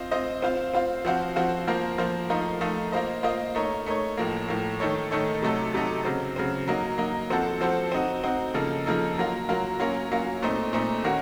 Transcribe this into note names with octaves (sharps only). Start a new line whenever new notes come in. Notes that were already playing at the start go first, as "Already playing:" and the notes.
Already playing: C4 F4 C5 D#5
C4 F4 C5 D#5
C4 F4 C5 F5
C4 F4 C5 F5
F3 C4 F#4 C5 F5
F3 C4 F#4 C5 F5
F3 A#3 F4 C5
F3 A#3 F4 C5
F3 A3 D#4 A#4 F5
F3 A3 D#4 A#4 F5
A#3 F4 C5 D#5
A#3 F4 C5 D#5
A3 D#4 A#4 C#5
A3 D#4 A#4 C#5
A2 F3 A#3
A2 F3 A#3
D#3 A3 D#4 A4 C#5
D#3 A3 D#4 A4 C#5
C3 F#3 A3 D#4 A4
C3 F#3 A3 D#4 A4
C#3 F#3 C4
C#3 F#3 C4
F#3 A#3 D#4
F#3 A#3 D#4
F3 C4 F#4 A4 C5
F3 C4 F#4 A4 C5
C4 D#4 F#4
C4 D#4 F#4
C#3 F3 A#3 D#4 A4
C#3 F3 A#3 D#4 A4
F#3 A#3 F4
F#3 A#3 F4
F#3 A#3 C#4 F4
F#3 A#3 C#4 F4
A#2 A3 C4 D#4
A#2 A3 C4 D#4
D#3 A#3 C#4 F#4